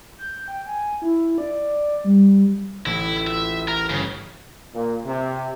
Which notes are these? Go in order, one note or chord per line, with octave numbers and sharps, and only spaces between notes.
G6
G5
G#5
E4
D5
G3
A1 E4
F4 E5
A#4
G1 C#3
A#2
C3